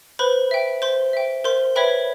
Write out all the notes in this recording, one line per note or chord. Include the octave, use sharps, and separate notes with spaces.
B4 C5 B5
E5 G5
C5 C6
E5 G5
A#4 C5 C6
B4 C#5 E5 G5 B5